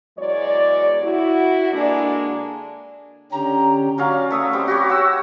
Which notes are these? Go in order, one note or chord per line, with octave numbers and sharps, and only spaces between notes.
E2 F#3 G#3 C#5 D5
E4 F#4
D3 G#3 A#3 D4
D3 C#4 G4 A#5
F#3 C#4 D5 F5
A3 E5 D#6
G3 C4
F#4 G4 C#5
F#5 E6